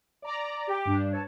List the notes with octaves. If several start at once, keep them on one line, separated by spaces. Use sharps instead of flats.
D5 A#5
G4
G2 D4
B4 C#5 A5